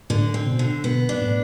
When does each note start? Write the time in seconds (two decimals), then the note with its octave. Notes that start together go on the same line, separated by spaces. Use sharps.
0.10 A2 D3
0.34 C4
0.47 B2
0.59 D3
0.84 B2 B3
1.09 D4
1.21 A2